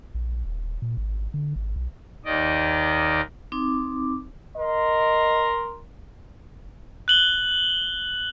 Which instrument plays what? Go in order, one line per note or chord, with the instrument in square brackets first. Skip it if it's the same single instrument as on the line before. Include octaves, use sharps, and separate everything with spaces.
[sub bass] A#1
D#1
A#2
G#1
D3
G#1
B1
[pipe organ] D#2 D#3 D5 D#5
[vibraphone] C4 D#4 D6
[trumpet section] A#4 C6 [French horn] D#5
[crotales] F#6 F#7 G7